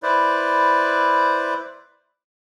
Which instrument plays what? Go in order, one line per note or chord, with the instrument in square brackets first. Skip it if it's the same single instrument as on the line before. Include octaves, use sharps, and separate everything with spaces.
[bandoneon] E4 B4 C5 D5